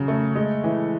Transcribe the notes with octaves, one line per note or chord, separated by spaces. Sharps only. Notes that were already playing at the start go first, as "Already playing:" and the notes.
Already playing: C#3 F#3
A3
G#3
E3